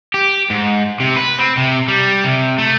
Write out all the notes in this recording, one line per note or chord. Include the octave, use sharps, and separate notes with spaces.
G4
G#2
C3
B4
C4
C3
G3
C3
A3